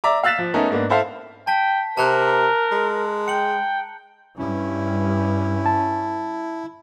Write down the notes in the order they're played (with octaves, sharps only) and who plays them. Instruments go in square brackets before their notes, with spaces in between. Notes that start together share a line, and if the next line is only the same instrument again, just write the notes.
[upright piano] D5 E5 A#5 D6
F5 E6 F#6 A6 B6 E7
F3
A3 B3 C#4 D#4 A4 A#4
G#2 A#3 B3 D4
E4 A4 C5 E5 F5
[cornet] G5 [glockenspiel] A5 B6
[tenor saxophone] C3 [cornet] A#4 [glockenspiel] A5 A#5 F#6
[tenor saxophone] G#3
[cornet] G5 [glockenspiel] C#7 F#7
[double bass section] G2 [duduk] C#4 [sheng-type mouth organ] E4
[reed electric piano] A5